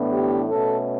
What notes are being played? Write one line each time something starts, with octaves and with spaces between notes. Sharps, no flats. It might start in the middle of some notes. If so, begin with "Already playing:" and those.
Already playing: A2 E3 B3 D4
G4
B2 A3 C#4 A4